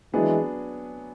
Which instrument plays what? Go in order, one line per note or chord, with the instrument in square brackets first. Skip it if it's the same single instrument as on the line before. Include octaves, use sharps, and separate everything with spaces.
[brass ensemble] E3 G#3 [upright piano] F#3 B3 D4 G#4